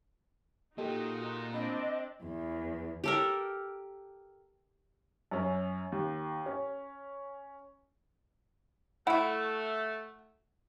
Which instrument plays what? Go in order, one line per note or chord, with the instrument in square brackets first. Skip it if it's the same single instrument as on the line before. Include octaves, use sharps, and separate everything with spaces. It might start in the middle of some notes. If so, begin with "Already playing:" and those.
[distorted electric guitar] A#2 A#3 [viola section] D#4 F#4 [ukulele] G4 A4 D#5
[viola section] C4 D4 [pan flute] D#5 [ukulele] B5
[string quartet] E2
[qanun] G4 A4 A#4
[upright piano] F#2 C#4
D#2
C#4
[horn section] A3 [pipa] E4 F#4 [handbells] F#5